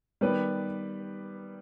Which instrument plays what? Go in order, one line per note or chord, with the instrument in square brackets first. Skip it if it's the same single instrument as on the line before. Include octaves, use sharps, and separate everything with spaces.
[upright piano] D#3 G3 B3 G4 B4